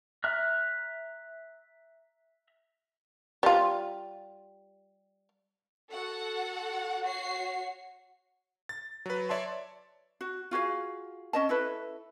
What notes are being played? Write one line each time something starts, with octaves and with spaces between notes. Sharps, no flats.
E5 A#5 F6 F#6
G3 F4
F#4 A4 F#5
F#4 C#5 F#5 C7
A6
F#3 B4
C#5 D5 E5 A5 C6
F#4
F4 F#4 G#4 F5
C#4 D#5 A5
E4 A4 B4